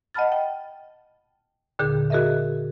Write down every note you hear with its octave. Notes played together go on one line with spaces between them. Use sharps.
D#5 F#5 A5 B5 F6 A6
G5
D#2 A#2 D3 G#4 G6
F#4 G#4 A#4 D#5 E5